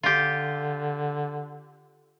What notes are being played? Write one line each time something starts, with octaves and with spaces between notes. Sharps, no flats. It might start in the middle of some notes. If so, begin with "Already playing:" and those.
D3 F4 G4